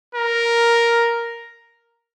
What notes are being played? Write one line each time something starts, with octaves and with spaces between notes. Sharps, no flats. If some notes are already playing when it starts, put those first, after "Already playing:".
A#4